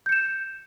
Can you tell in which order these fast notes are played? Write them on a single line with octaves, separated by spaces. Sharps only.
G6 C#7 E7